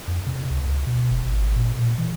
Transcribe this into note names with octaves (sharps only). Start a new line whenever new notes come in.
F2
C3
C#2
C#2
B2
F1
G#1
A#2
A#2
E3